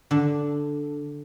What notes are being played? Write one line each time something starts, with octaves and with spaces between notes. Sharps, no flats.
D3 D4